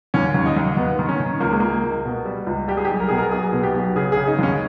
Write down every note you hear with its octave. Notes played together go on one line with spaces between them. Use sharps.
D#2 C#4
D#2
D#4
D#2
D#2 B3
D#3
C#4
D#3
C#2 A#3
G#3
C#2 A#3
C#2
B2
G3
C#2
G3 G4
G#4
G4
B1
A#4
B2 G#4
A#4
B1 G#4
B2
G4
B1
C#3 G#4
G#4
C#3
D#4
D#2 C#4